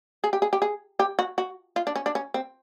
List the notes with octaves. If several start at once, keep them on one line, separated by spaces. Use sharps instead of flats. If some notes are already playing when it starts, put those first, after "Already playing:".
G#4
G4
G#4
G4
G#4
G4
F#4
F#4
F4
D4
C#4
D4
C#4
C4